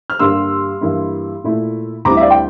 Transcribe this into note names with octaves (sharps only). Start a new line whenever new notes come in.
F6
G2 D3 G3 A#3 C6 E6
G2 E3 A#3 E4
A#2 A3 E4
D2 D3 G3 C4 E4 A#5 D6
E5
D5 F5
G5